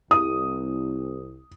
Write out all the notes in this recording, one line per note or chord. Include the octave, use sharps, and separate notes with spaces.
C2 D#6